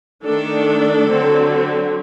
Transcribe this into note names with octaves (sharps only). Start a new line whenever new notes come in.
D#3 A3 D4 A4
D3 F#3 C4